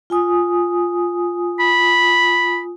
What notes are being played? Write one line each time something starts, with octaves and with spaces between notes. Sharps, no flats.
F4 G#5 D#6
B5